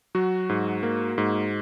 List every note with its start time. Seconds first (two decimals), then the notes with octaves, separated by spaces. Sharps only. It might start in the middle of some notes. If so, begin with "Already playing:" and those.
0.15 F#3 F#4
0.49 G#2
0.83 A#3
1.18 G#2